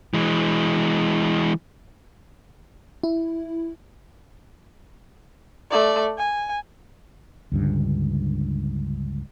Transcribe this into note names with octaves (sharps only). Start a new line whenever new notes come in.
E3 G#3
E4
A3 D5
G#5
C#2 G2 D3